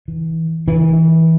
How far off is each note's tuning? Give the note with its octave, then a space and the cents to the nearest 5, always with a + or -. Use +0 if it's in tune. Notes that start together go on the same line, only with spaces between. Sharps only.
E3 -25
E3 -25